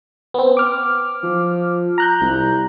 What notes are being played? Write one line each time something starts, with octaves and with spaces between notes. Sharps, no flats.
B3 C4
D6 F6
F3
A#5 F#6 G6
C2